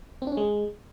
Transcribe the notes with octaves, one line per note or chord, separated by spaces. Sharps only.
C4
D4
C#4
G#3